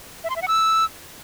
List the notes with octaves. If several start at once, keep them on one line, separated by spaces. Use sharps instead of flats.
E5
C6
E5
F#5
E6